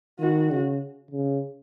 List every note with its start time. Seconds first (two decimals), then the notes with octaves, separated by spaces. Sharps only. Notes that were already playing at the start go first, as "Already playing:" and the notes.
0.20 D#3 F#4
0.51 C#3
1.11 C#3